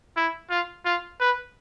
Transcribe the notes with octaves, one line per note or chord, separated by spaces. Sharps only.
E4
F4
F4
B4